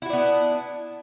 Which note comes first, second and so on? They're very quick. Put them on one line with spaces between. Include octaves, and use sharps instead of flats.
E4 F#4 D4 B3